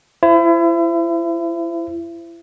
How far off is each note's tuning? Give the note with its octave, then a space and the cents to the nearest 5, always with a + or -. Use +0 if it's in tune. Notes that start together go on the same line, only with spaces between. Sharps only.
E4 +35 C5 -10